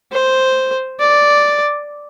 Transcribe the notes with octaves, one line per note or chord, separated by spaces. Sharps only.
C5
D5